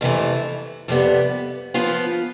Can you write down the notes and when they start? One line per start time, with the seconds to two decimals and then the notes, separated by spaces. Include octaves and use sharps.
0.01 F2 C3 E3 A3
0.88 F2 C3 G3 B3
1.74 F3 B3 F4 B4